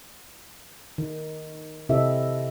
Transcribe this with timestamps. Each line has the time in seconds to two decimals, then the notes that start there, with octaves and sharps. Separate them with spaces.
0.98 D#3
1.89 C3 E4 G4 A4 D#5 E5